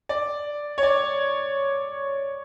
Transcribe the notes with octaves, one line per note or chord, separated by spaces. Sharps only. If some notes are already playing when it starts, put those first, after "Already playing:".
D5
C#5
D5